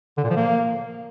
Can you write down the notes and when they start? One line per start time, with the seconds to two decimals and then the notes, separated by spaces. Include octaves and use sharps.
0.17 D3
0.24 A#2
0.30 F3
0.37 A#3